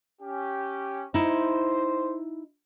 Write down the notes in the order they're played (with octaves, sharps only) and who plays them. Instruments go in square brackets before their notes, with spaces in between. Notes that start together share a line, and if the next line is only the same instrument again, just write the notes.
[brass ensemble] C#4 G4
[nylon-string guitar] D#4 E4 [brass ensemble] C5